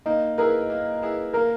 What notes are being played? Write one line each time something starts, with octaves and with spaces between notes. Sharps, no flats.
A#3 D#4
E4 G#4 A#4 B4
A#3
E4 G#4 B4
A#3 A#4